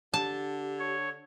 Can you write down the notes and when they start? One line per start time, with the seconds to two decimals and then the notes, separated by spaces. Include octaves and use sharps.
0.14 D3 G4 A5
0.79 C#5